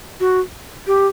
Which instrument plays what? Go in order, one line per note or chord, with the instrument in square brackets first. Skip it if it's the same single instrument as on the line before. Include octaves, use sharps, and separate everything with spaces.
[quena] F#4
G4